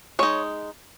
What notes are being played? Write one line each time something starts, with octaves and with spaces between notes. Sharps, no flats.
G#3 D#4 C#5